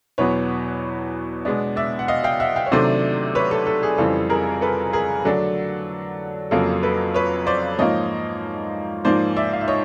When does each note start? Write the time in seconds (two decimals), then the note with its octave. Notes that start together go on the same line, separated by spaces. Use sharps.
0.18 E2 B2 F#3 B3 B4 C#5
1.45 B2 G#3 B3 D4
1.76 D5 E5
1.99 F#5
2.08 D#5 F5
2.24 F5 G5
2.40 E5 F#5
2.56 F5 G5
2.66 C#5
2.72 C3 D#3 F#3 A3 D4 C5 D5
3.35 B4 C#5
3.51 A4
3.67 A4
3.83 G#4
3.98 F2 C#3 E3 G3 C4 A4
4.30 G#4 A#4
4.61 A4 B4
4.93 G#4 A#4
5.25 D3 F#3 A3 D4 A4
6.51 F2 C#3 F#3 A#3 A4
6.83 A4 B4
7.14 B4 C#5
7.47 C5 D5
7.78 G#2 F3 A#3 C#5 D#5
9.05 G#2 F3 A#3 C5 D5
9.37 D5 E5
9.53 F5
9.61 E5
9.68 C#5 D#5